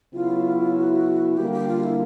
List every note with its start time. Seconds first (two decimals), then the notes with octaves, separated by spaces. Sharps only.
0.14 C#3 F#3 B3 E4 F4
0.76 F#4
1.37 D3 G3 A#3 G4
1.52 G4
1.68 F4
1.84 E4